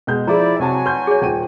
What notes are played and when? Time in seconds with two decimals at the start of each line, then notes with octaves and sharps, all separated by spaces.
0.07 B2 G#3 G6
0.27 F3 E4 G#4 D5 A#5
0.60 C3 F#3 F#4 G#5 A5
0.86 B4 C6 G6
1.07 G#4 C#5
1.22 D#1 G5 D#7